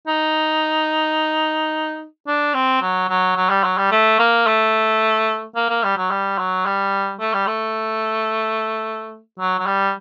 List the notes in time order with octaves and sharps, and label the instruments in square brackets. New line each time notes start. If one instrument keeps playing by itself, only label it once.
[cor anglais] D#4
D4
C4
F#3
F#3
F#3
G3
F#3
G3
A3
A#3
A3
A#3
A#3
G3
F#3
G3
F#3
G3
A3
G3
A3
F#3
F#3
G3